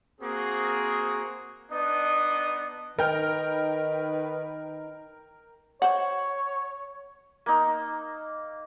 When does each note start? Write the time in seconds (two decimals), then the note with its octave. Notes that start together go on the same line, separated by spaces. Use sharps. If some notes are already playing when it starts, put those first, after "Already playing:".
0.21 A#3 C4 F#4 G#4
1.71 B3 D4 D#4 D#5
2.99 D#3 D#4 A#4 B4 G5 F6
5.82 C5 C#5 F#5
7.46 A#3 D#4